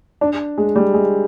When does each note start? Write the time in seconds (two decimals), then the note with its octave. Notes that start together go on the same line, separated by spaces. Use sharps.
0.21 D4
0.58 G#3
0.76 G3
0.94 G#3